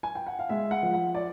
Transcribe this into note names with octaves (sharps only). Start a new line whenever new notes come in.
G#5
G5
F#5
F5
G#3 E5
F#5
F3
F#5
D5